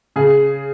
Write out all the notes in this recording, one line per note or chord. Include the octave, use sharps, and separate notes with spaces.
C#3 G#4